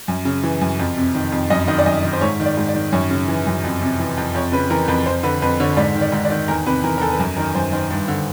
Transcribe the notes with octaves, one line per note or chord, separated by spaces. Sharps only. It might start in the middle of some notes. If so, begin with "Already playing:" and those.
F#2
C#3
E3
F#2
F2
C3
D#3
F2
F#2 D#5
D#3 D#5
D5
F#2 D#5
D#3
C5
G#2 C#5
D#3
D5
G#2
D5
D#3
F#2 C#5
C#3
E3
F#2
F2
C3
E3
F2
F2 C#5
C#3 B4
E3 A#4
F2 B4
F2 C5
D3 B4
F2 B4
D3 C#5
G#2 D5
D#3
D5
G#2
D5
D#3
E2 A#4
C3 B4
E3 A#4
A#4
E2 A4
B4
F#2 A#4
D#3 A#4
F#2 C5
D#3 C5
G2
D3